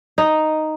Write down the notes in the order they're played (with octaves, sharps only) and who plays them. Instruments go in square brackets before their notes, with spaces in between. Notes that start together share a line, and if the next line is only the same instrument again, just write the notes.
[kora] D#4